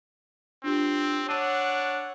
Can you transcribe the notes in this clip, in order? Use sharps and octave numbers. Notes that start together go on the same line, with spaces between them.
C4 D4 F4 G4
D4 C#5 F#5 A5 E6 D#7